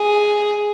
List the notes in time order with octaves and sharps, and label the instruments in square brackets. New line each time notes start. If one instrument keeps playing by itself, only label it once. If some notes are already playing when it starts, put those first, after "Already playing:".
Already playing: [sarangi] G#4